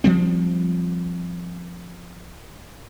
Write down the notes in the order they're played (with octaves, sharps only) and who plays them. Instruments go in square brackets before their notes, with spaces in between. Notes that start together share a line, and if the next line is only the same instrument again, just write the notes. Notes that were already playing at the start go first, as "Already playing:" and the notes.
[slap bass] F3 G3 C4